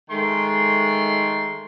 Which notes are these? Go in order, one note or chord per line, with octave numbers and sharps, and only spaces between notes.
D#3 G#3 A3 C6